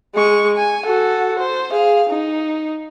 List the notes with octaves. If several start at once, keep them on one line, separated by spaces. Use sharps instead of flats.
G#3 C#6
G#5
F#4 A4
C5
G#4 F5
D#4